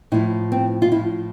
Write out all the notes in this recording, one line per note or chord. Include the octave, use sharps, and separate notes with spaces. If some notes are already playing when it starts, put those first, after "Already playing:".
A2 F3 E4
C4
F4
A2 F3 E4